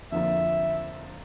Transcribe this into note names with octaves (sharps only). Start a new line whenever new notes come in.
F2 D3 F3 A#3 E5